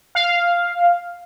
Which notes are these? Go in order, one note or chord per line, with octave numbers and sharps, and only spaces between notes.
F5